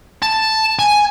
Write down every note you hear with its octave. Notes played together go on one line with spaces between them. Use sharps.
A5
G#5